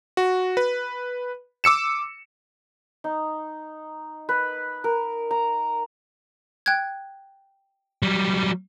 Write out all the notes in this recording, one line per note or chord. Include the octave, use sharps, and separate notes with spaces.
F#4
B4
D6 E6 C#7 E7
D#4
B4
A#4
A#5
G5 F#6 G#6
F#3 G3